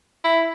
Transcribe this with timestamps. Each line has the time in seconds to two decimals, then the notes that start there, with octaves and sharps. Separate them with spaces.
0.24 E4